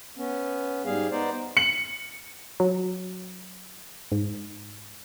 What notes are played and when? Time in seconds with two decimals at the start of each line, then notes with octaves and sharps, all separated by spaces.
0.17 B3 C#4
0.85 G#2 G3 G#4 F5
1.12 B3 D#4 C5 D5
1.57 C#7 F#7
2.60 F#3
4.12 G#2